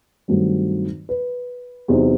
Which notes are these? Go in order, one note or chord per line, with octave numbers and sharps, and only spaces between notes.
G2 D#3 F#3 A3 C4
B4
E2 C3 F#3 C4 D#4